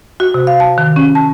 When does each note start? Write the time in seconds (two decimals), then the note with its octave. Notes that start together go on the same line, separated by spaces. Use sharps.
0.20 F#4
0.34 C3
0.47 F5
0.60 A5
0.78 D#3
0.96 C#4
1.15 A5